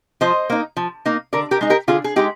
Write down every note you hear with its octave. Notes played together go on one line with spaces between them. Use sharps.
F3 C5 D#5
A#3 D#4
F3
A#3 D#4
D3 A#4 D5
G4 A#4
G#3 D#4
G4 A#4
D3 F4 G#4
G#4
G#3 D#4 G4